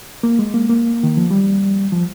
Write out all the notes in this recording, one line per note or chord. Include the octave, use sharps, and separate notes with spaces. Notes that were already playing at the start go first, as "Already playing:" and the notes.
A#3
G#3
A#3
A#3
D#3
F3
G3
F3